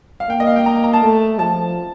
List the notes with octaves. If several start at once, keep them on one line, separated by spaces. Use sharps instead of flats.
F5
A#3 G5
D#5
F5
G5
A#5
A#5
A5
A3
F3 A5